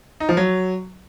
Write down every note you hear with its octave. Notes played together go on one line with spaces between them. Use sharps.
D#4
F3
F#3